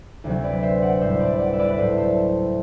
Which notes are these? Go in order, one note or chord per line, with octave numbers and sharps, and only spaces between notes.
D2 C3 F#3
B4 D5
C5 E5
D5 F#5
A2 G3 C5 E5
B4 D5
D5 F#5
E5
B4 D5
B4
A2 F#3 A4 C5
A4 C5